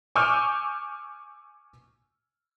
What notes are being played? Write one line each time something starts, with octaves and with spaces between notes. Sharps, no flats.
G#5 C#6 D6 E6 F6 G6